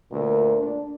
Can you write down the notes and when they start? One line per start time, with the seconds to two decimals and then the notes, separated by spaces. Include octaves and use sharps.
0.11 D2 A#2
0.60 D4